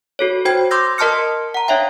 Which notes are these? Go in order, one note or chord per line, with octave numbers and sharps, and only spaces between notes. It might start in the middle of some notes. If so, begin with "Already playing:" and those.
F#4 A4 C#5
F#4 C5 G5 G#6
C6 D6 E6 G6 A#6
A#4 D#5 A5 C6 F6 C#7
F#5 A#5
D4 C#5 E5 F5 G5